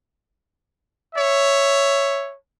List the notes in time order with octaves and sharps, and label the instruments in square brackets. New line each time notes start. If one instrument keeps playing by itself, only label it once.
[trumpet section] C#5 E5